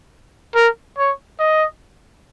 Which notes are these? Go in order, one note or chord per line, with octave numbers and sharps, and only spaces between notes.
A#4
C#5
D#5